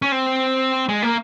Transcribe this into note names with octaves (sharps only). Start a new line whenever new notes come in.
C#4
C4
G#3
A#3